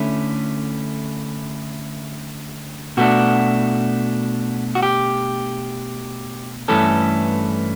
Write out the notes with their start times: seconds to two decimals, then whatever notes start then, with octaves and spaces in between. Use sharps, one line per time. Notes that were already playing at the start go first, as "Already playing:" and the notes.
Already playing: D3 A3 C#4 E4
2.97 B2 A3 D4 F#4
4.75 F#4
4.83 G4
6.68 G2 E3 A3 C#4 A4